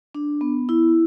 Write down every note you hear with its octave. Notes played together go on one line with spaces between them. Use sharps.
D4
B3
E4